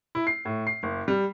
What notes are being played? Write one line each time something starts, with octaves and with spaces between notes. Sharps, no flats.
E4
C7
A2
C7
F#1
G3